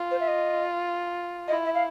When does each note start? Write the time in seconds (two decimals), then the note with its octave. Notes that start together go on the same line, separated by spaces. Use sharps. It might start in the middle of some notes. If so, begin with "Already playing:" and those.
Already playing: F4
0.11 C5
0.20 E5
0.28 D#5
1.48 E4 D#5
1.65 E5
1.74 F5